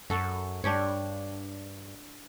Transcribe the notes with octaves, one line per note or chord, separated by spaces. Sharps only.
F#2 F#4 A4
G2 D4 G4 C#5